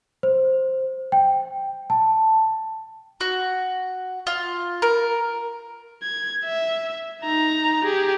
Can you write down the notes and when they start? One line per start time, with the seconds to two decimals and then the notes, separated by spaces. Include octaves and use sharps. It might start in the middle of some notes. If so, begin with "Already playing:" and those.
0.23 C5
1.12 G5
1.90 A5
3.21 F#4
4.27 F4
4.82 A#4
6.03 G#6
6.45 E5
7.23 D#4 A#5
7.84 G4 G#4